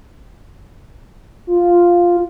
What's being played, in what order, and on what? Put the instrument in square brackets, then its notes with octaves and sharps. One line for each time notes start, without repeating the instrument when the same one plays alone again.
[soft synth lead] F4